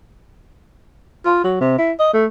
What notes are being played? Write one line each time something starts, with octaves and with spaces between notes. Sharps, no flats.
F4
F#3
C3
E4
D#5
A3